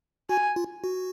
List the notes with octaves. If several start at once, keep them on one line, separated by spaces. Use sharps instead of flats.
F#4 G#5
F4
F#4